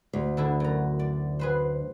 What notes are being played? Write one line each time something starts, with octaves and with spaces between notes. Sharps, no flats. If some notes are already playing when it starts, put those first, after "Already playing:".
D2
D3 E4 G#4
F#2 A#5
D5
G#4 B4 C5